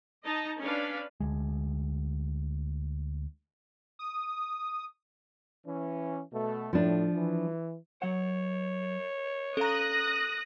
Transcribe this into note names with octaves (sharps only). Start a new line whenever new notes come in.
D#4 D#5 A5 A#5
C#4 D4 B4 F5
D2 G#3
D#6
E3 C#4
B2 A3
A2 F3 D4
E3
F#3 C#5 F#5
C#4 A4 F5 A#5 D#6 F#6 A#6